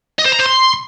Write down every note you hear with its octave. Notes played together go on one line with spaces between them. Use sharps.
D#5
C5
A#5
C5
C6